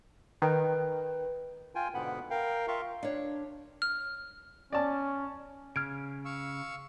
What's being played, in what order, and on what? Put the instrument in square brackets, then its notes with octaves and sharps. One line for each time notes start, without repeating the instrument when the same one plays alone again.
[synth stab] D#3 [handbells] B4 G5
[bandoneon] F4 G5 G#5
G#2 B2 D3 B3 F#5 B5
A#4 F5 G5
F4 A#4 E5 F5 C6 C#6
[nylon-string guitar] D4 C#5
[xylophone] F6
[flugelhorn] C#4 [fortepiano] D5 A5
[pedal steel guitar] C#3 [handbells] F6 G#6 D7
[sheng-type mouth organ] F5 C#6 E6